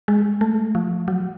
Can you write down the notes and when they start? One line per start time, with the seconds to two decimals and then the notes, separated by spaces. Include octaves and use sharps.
0.08 G#3
0.41 A3
0.75 F3
1.08 F#3